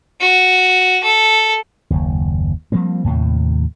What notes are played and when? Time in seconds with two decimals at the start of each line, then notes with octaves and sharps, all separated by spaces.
0.21 F#4
1.04 A4
1.90 F#1 D#2
2.72 F3 G3 A#3 C4
3.04 D#2 A2 C3